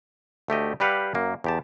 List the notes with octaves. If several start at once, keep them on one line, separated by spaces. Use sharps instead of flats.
D2 A3 G4 D#5
G3 G4 B4 F5 F#5
F#2 A#3
E2 G4 A5